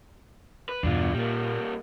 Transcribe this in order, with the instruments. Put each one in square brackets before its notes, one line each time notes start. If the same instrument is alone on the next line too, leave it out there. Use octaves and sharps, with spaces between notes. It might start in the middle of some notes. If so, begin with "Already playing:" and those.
[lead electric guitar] B4
[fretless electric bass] E2 G2 B2 [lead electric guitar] D4 F4
[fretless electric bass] A#2 [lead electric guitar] G3 A#3